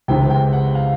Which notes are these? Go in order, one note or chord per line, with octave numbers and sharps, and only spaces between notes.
C#2 C3 E3 G#3 G5
G5
F#5
F5